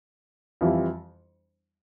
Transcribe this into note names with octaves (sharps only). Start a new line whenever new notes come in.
F2 E3 G3